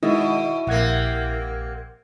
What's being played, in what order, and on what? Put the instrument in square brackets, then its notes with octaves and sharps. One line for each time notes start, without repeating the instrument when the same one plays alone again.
[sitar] B2 [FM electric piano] D#3 G#3 D#5 [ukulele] E4
[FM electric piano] A#1 F#5 G#6 [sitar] C3 A#3